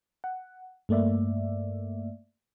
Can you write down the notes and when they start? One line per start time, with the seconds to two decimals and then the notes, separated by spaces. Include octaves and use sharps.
0.24 F#5
0.89 G2 A3 A#3 D5 E5